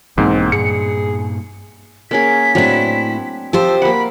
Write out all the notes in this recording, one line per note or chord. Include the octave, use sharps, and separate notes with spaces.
B1 G#2 E3 A#3 C4
G2 A#2 G#4 C#7
A#3 C#4 G#4 B6
A2 F#3 C4 D4 E4
F3 G4 C5 A5 E6
A#3 F#5 B5